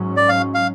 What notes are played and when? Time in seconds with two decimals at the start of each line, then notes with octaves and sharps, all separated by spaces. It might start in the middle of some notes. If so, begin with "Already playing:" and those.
Already playing: G#2 F#3 C#4
0.17 D5
0.29 F5
0.54 F5